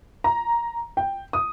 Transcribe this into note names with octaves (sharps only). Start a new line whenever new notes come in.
A#5
G5
D#6